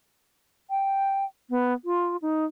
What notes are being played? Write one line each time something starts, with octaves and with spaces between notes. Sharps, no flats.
G5
B3
F4
D#4